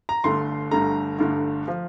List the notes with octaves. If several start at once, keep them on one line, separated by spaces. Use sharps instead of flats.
A#5
G1 G2 D3 A3 C6
G1 G2 D3 A3 A#5
G1 G2 D3 A3
F3